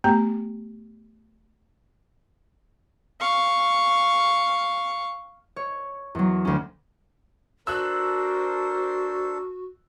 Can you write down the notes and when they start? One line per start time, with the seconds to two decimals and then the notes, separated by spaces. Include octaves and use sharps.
0.04 A3 B3 G4 G5 A#5
3.20 F5 C#6
5.56 C#5
6.15 E2 F#3
6.45 D2 C#4
7.67 D4 F#4 A4 A#4 C5 E6 F#6